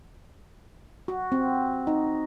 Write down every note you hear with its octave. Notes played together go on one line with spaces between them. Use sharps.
F#4
C4
D#4